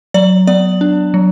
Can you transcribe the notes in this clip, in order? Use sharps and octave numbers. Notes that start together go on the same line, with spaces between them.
F#3 D5
B3 D5
D4
F#3